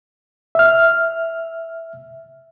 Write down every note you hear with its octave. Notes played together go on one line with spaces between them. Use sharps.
E5 F6